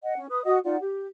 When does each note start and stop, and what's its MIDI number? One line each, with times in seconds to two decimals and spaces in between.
0.03 0.16 75
0.03 0.16 78
0.17 0.26 61
0.30 0.43 71
0.30 0.43 87
0.45 0.58 66
0.45 0.58 75
0.45 0.58 78
0.45 0.58 87
0.64 0.76 63
0.64 0.76 65
0.64 0.76 74
0.64 0.76 78
0.80 1.07 67